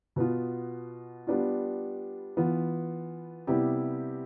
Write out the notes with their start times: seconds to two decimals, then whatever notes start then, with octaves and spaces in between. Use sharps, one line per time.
0.16 B2 B3 F4
1.27 G3 B3 D4 F4
2.37 E3 B3 F4
3.47 C3 G3 B3 E4 G4